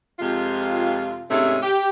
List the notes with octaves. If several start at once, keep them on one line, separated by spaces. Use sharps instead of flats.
F2 C3 G#3 F4
G#2 C3 G#3 A3 C#4 E5
G4